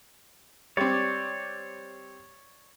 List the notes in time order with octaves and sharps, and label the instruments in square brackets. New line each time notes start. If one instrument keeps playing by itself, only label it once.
[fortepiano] G3 C4 [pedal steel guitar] C#5 D5